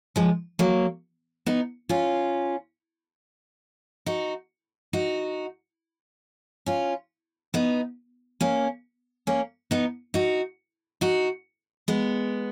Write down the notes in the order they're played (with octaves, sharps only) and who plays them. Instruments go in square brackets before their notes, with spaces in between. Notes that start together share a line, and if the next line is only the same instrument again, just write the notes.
[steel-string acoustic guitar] F3 G#3
F#3 A#3
B3 D#4
C#4 F4
D#4 F#4
D#4 F#4
C#4 F4
B3 D#4
A#3 C#4
A#3 C#4
B3 D#4
D#4 F#4
D#4 F#4
G#3 B3